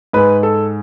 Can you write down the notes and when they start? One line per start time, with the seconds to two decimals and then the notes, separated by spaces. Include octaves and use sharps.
0.13 G#2 G#3 B4
0.43 A4